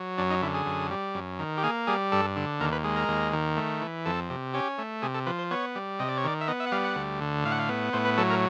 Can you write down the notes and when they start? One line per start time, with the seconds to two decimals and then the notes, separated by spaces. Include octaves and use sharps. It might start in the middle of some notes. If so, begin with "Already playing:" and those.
Already playing: F#3
0.18 F#2 D4
0.30 D#4
0.42 D3 E4
0.54 G#4
0.66 F#2
0.91 G3
1.15 F#2
1.39 D#3
1.57 G4
1.63 A#3 G#4
1.87 G3 G#4
2.12 G2 A4
2.36 D3
2.60 D#2 A#4
2.72 B4
2.84 G#3
2.96 A#4
3.09 D#2
3.33 D#3
3.57 A3
3.81 E3
4.05 F2 A4
4.30 C3
4.54 C#4 G4
4.78 A3
5.02 C3 G#4
5.14 A4
5.26 F3 B4
5.39 C5
5.51 B3 C#5
5.75 G3
5.99 C3 D#5
6.08 D5
6.17 C#5
6.24 D#3 D5
6.41 E5
6.48 B3 D#5
6.60 E5
6.67 F#5
6.72 G3 F5
6.84 F#5
6.96 D2
7.21 D3
7.45 A2 F5
7.52 F#5
7.59 F5
7.69 B3
7.93 A2 C5
8.05 B4
8.17 F#3 A4
8.30 A#4